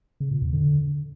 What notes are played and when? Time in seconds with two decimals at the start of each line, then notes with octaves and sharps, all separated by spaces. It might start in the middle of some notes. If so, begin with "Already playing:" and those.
0.20 C#3
0.31 A#2
0.42 E2
0.53 D3